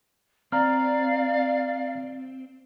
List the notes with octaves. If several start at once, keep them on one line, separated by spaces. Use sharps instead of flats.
C4 D5 F5 A#5 F6